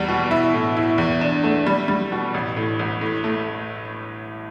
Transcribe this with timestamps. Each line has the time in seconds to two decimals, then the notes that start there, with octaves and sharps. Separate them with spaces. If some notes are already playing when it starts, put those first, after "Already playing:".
Already playing: E2 G3
0.09 B2
0.31 E4
0.54 A2
0.77 E4
0.98 E2
1.21 D4
1.44 A3
1.67 G3
1.88 G3
2.12 B2
2.34 A1
2.57 A2
2.79 A1
3.01 A2
3.24 A3